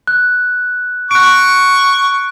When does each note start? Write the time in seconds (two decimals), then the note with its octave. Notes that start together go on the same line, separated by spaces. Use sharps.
0.07 F#6
1.11 C#6 F#6 D7